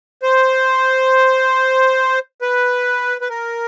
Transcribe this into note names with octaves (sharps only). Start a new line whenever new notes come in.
C5
B4
B4
A#4